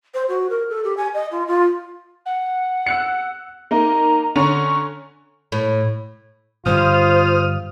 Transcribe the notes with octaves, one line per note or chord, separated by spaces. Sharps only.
C5
F#4
A#4
A4
G4
G#5
D#5
F4
F4
F#5
E6 F#6 C#7
A#3 D#4 A#5
D3 C#4 A#5 C#6
A2
G2 D3 F4 C5 D#6 F6